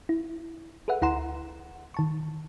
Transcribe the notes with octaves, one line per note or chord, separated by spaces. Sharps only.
E4
G#4 A4 B4 E5 F#5
D2 E4 F#5 A#5 C6 E7
D#3 A5 C#6